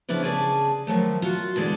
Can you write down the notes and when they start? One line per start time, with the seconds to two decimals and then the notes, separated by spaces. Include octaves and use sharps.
0.09 C#3 F3 B3 D4 E4 B4
0.24 C#3 G#4 D5 G#5 A5
0.87 D#3 F3 F#3 A3
1.22 F4 F#4
1.56 E2 D3 G#3 E4 A4 D5